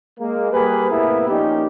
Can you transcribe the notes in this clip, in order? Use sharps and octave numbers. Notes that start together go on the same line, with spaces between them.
G#3 A#3
G3 A#3 G#4 B4
A2 C3 A#3 B3 E4
A#1 A#2 C#4 D#4 G4